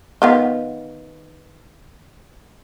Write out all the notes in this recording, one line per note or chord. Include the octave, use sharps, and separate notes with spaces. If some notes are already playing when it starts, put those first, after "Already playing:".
D#3 B3 F4